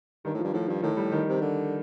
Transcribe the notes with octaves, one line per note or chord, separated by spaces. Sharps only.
G2 D#3
A2
F3
G2
A2 F3
G2 F3
A2 D#3
G3
D#3
C3
D3